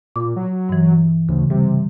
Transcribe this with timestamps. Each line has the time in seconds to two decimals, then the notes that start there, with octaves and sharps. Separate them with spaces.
0.16 A#2 D6
0.36 F#3
0.69 G2 E3
1.29 D2 C#3
1.50 C3 G3